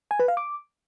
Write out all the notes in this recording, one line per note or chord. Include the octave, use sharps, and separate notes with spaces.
G#5
B4
F5
D6